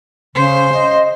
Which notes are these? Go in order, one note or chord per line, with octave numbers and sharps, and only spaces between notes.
C#3 C5
D#5